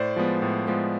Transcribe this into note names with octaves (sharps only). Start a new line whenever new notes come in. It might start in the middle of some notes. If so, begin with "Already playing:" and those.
Already playing: A2 C5 D5
F3 G#3 B3
A2
F3 G#3 B3